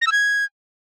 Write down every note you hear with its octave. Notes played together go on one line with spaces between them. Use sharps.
A#6
E6
G#6